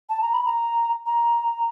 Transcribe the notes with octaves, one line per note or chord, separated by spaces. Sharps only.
A5
A#5
B5
A#5
A#5